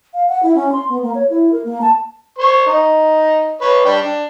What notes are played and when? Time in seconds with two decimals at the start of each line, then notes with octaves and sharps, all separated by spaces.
0.14 F5
0.29 F#5
0.43 E4
0.55 C#4
0.72 C6
0.89 B3
1.03 A#3
1.15 C#5
1.30 E4
1.52 A#4
1.64 A#3
1.82 A5
2.38 C5 C#6
2.66 D#4
3.61 B4 C#5
3.85 D4 D5 G5
4.01 D4